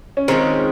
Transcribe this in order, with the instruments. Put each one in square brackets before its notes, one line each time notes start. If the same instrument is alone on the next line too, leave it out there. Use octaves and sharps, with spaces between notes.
[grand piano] C#4
[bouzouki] D#3 G#3 C#4 F4 [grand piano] C4